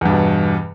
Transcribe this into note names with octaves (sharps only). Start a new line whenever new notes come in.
E2 G2 B2